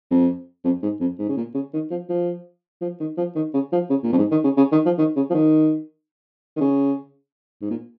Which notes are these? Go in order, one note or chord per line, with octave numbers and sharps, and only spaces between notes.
F2
F2
G#2
F2
G#2
C#3
A#2
C#3
D#3
F3
F3
F3
D#3
F3
D#3
C#3
F3
C#3
A#2
F2
G#2
D#3
C#3
C#3
D#3
F3
D#3
C#3
F3
D#3
D#3
C#3
G#2
A#2